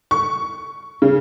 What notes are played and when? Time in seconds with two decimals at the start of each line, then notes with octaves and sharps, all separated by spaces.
0.11 C#6
1.02 C#3